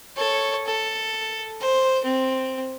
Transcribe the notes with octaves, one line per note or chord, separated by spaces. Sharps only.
A4 C#5
A4
C5
C4